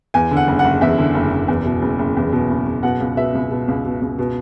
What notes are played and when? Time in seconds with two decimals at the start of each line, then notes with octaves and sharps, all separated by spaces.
0.14 E2 G#5
0.31 D3
0.37 F#5
0.48 F#1
0.59 F#5
0.64 F#1
0.81 E2 E5
0.98 D3
1.15 F#1
1.32 F#1
1.48 E2
1.65 B2
1.82 F#1
1.99 F#1
2.17 E2
2.32 B2
2.50 F#1
2.67 F#1
2.83 B2 F#5
3.00 C#2
3.17 B2 E5
3.35 C#2
3.51 B2
3.68 C#2
3.85 B2
4.02 C#2
4.19 B2